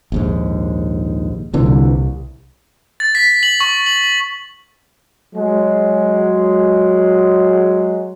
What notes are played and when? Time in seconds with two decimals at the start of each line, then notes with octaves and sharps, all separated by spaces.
0.12 A#1 D#2 G#2
1.54 C2 A#2 D3 E3
3.00 A6
3.15 B6
3.43 F#7
3.60 C#6
3.86 F#7
5.35 F#3 G#3